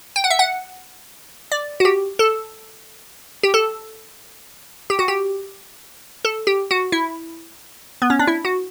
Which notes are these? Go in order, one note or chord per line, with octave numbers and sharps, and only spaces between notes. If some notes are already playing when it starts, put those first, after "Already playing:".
G5
F#5
E5
F#5
D5
F#4
G4
A4
G4
A4
G4
F#4
G4
A4
G4
F#4
E4
B3
C#4
D4
E4
F#4